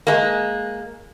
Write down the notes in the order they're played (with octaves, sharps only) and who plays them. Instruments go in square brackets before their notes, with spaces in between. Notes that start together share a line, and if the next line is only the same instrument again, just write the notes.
[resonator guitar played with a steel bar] G#3 A#3